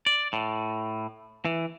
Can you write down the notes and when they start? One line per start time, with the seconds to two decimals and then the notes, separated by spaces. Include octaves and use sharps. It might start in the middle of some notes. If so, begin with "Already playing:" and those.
0.06 D5
0.33 A2
1.45 E3